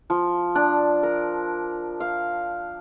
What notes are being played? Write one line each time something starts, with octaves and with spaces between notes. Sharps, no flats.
F3
D4
A#4
F5